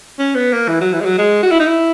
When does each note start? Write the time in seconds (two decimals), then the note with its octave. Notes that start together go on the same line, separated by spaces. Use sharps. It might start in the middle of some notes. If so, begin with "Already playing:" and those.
0.19 C#4
0.35 B3
0.52 A#3
0.68 E3
0.81 F#3
0.93 E3
1.01 G#3
1.05 F#3
1.18 G#3
1.43 F#4
1.51 E4
1.59 D#4
1.67 E4